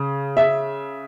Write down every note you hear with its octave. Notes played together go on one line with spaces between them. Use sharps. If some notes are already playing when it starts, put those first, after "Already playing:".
Already playing: C#3
E5